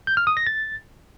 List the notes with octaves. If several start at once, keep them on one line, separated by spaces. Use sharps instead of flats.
G6
F6
D#6
A#6
A6